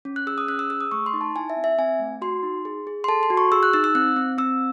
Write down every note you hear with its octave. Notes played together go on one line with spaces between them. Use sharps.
C#4
F#6
G#4 E6
D#6
C#4 F#6
E6
G#4 E6
D#6
A3 C#6
C6
D#4
A5
E4 G#5
E5
C4
E5
C4 G#5
A3
F#4 C6
D#4
G#4
G#4
C6
A4 A5
C6
F#4
C#6
G#4 E6
F#6
D#4 E6
E6
C4 F#6
C4
C4 E6